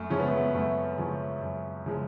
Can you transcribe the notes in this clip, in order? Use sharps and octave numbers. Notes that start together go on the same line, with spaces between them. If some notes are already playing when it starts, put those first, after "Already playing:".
Already playing: F#2 A3
C#3 F3 G#3 C#4
B3
A3
B3
F#2 A3
C#3 F3 G#3
F#2
C#3 F3 G#3